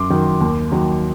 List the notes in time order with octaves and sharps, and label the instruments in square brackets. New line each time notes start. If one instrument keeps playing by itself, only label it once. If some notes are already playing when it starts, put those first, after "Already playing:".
Already playing: [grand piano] F#2 C6 D6
D#3 F#3
D#2
D#3 F#3